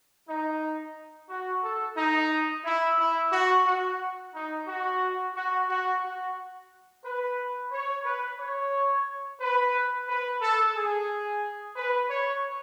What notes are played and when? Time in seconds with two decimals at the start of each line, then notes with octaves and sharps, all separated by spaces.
0.28 D#4
1.29 F#4
1.64 A4
1.96 D#4
2.65 E4
2.98 E4
3.31 F#4
3.66 F#4
4.34 D#4
4.67 F#4
5.35 F#4
5.68 F#4
6.02 F#4
7.04 B4
7.72 C#5
8.05 B4
8.39 C#5
9.40 B4
10.08 B4
10.41 A4
10.76 G#4
11.76 B4
12.10 C#5